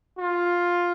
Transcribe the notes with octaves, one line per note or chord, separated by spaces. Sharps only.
F4